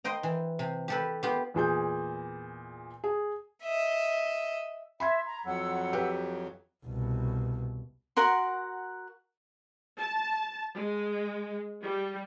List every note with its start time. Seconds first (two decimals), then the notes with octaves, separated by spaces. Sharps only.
0.04 C5 D#5 G5 A#5
0.23 E3
0.59 C3
0.88 G4 A4 B4
1.23 B3 F4 G4
1.54 E2 A#2 G#4 G6
3.04 G#4
3.63 D#5 E5
5.00 E5 B5 C6 G#6
5.26 A#5
5.45 F2 F#3 F#5 E6
5.93 G4 B4
6.86 C2 B2
8.17 F#4 A#4 F#5 C6
9.98 A5
10.76 G#3
11.83 G3